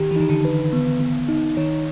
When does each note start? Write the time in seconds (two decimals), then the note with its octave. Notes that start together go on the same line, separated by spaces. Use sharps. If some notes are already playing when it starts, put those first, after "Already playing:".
Already playing: D#3 G4
0.11 E3
0.16 D#3 D#4
0.29 D3
0.45 B4
0.73 B3
1.00 B3
1.29 D#4
1.57 D#3 C#5